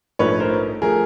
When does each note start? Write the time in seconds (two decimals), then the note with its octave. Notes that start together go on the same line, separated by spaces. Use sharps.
0.19 A#1 G#2 F3 A3 B4 C#5
0.40 A#4 C5
0.82 F3 A3 G#4 A#4